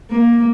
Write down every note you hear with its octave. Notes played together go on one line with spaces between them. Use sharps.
A#3